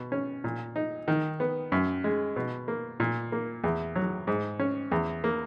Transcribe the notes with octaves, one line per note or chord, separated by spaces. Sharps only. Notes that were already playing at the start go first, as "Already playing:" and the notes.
Already playing: B2
C#4
A#2
D#4
D#3
B3
F#2
G#3
B2
A#3
A#2
A#3
E2
F#3
G#2
C#4
E2
A#3